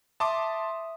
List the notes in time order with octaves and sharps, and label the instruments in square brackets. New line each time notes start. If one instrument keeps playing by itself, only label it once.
[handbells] E5 D#6 [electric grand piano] A5 C6 D6